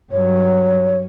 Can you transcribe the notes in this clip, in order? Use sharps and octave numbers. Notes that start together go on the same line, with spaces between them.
G2 F#3 C#5